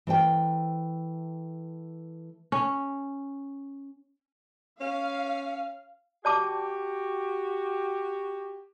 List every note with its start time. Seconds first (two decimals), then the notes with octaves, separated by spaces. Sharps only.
0.07 E3 A3 C5 G5
2.52 C#4
4.81 C#4 F5
6.25 F#4 G4 D5 A5 D6